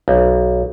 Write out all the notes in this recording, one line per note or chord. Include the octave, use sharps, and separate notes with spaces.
B1